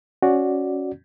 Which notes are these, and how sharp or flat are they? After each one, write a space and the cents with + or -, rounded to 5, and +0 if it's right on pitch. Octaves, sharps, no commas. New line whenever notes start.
C#4 +0 F#4 +0 D5 +0